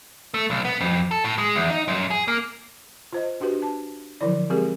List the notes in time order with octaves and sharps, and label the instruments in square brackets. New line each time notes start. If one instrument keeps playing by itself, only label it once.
[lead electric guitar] A3
B1
B3
F2
A4
A2
G#3
E2
D#4
F#2
G#4
A#3
[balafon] F4 C5 D#5
D4 F#4 G4 B4
A5
D3 F3 F#3 E4 D5
G#3 C4 G4 G#4 A#4